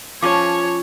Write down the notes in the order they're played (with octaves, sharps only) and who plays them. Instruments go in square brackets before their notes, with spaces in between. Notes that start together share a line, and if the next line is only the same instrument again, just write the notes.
[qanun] F3 C#4 [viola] C#5 [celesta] A5 D6